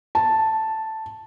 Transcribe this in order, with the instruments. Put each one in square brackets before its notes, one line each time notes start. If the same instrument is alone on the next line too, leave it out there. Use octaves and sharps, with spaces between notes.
[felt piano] A5